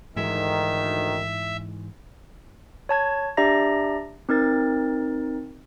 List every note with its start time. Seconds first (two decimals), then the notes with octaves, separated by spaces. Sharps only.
0.16 D2 G#2 D#3 E3 G#3 E5
2.89 C#5 A5 G#6
3.37 D4 G4 D5 E5 A#5 A#6
4.29 C4 D#4 A#4 A6